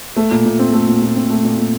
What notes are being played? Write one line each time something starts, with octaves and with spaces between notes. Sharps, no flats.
A3
A#2
A#2
C4
A3
A#2
A#2
C4
A3
A#2
A#2